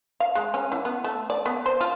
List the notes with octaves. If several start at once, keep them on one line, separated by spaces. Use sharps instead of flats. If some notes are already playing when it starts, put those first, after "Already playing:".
F5
G#3
C#4
E3
B3
A3
D5
B3
C5
F4